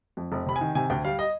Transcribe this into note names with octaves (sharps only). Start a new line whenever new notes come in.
F2
F1
C3 B5
G#5
D#3
C3 G#5
D2 G5
G3 F5
D#5